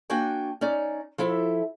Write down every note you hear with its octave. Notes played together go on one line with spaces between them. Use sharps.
A#3 D4 F#4 G5 G#5
C#4 D#4 D5
F3 E4 A4 E5